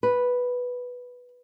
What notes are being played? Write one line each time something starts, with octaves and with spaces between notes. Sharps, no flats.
B4